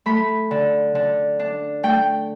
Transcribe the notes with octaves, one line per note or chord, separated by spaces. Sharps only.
A3 B5
D3
D3
D4
A3 G5